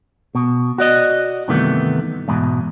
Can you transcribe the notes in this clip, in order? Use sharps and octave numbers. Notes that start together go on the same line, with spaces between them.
B2
F#4 D5 D#5
G2 C3 D#3 E3 A3 B3
E2 G#2 B2